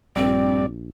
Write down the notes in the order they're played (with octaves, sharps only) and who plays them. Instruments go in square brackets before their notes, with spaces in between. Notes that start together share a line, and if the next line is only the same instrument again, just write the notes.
[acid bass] A#1 [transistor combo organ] G2 D5 [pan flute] C4